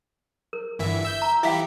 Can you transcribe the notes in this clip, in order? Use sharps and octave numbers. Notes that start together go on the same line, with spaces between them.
A#4
G1 E3 E5
E5 E6 G6
A#5
E3 E4 G4 E5 F5 G5